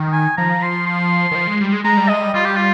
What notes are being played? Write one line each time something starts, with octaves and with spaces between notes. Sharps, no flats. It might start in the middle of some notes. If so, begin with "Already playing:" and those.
Already playing: D#3
G#5
F3 A#5
C6
C6
D#3
F3
G#3
G3
G#3
G#3 A#5
G3
G#3 D#5
G3
G3 F4
G4
F4